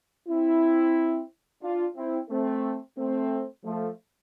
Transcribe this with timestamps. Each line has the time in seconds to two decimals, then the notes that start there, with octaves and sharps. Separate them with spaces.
0.28 C4 E4
1.62 D4 F4
1.95 C4 E4
2.30 A3 C4
2.97 A3 C4
3.65 F3 A3